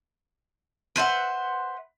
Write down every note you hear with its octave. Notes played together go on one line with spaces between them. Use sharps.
B4 C5 E5 F#5